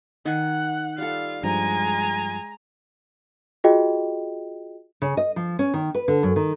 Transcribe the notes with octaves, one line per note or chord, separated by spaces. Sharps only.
D#3 F#5 G#5
G3 F4 A4 F5
G2 F3 G#3 G#5 A#5
F4 F#4 G#4 D#5 G5
C#3
D#5
F3
C#4
D#3
B4
D3
F#2
D#3